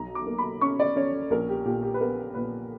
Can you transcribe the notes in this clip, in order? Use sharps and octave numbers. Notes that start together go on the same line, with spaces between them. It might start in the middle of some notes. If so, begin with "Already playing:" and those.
Already playing: B1 A#5
D6
A#3
B5
C#4 C#6
D5
C#4 C#5
A#1 A#4
G4
A#2 G4
G4
B4
B3 A#4
A#2 B4